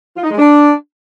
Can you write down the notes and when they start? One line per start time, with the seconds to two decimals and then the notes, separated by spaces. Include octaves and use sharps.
0.16 F4
0.24 D#4
0.31 G#3
0.38 D4